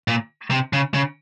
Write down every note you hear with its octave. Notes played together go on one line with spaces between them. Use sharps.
A#2
C3
C#3
C#3